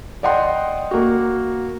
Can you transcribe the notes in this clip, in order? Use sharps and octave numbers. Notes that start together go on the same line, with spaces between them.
D5 D#5 F#5 G5 C6
A#3 F#4